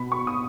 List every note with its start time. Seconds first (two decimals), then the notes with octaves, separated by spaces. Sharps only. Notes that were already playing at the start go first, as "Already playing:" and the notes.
Already playing: B2 B3 B5
0.12 C#6
0.27 D#6